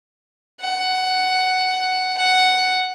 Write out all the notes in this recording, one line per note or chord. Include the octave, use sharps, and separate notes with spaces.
F#5
F#5